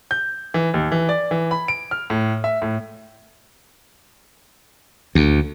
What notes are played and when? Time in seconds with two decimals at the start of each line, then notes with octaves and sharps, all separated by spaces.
0.11 G6
0.54 E3
0.74 D#2
0.92 E3
1.09 D5
1.31 E3
1.51 B5
1.68 D7
1.91 F6
2.10 A2
2.44 E5
2.62 A2
5.15 D2